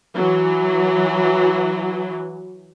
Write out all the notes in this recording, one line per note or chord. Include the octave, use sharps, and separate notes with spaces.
E3 F#3